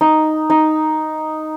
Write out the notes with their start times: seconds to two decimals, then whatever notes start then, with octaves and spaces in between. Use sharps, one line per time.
0.01 D#4
0.50 D#4